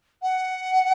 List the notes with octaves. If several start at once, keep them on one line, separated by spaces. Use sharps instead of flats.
F#5